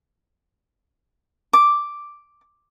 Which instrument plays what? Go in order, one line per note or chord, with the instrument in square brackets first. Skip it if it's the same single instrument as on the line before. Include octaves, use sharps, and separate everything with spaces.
[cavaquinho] D6